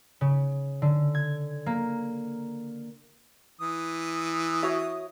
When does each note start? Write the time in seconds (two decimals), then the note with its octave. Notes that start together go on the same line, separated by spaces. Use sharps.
0.21 C#3
0.82 D3
1.15 G#6
1.66 A#3
3.61 E3 D#6
4.63 F#4 C#5 E5